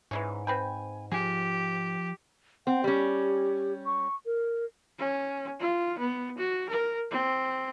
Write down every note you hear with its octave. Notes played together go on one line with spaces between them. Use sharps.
G#2 E3 G#3 C#4
C4 B4 G5 G#5
F3 F4 G4 G#4
C4 F#5
G3 C#4 G4
C#6
A#4
C#4
F4
B3
F#4
A#4
C4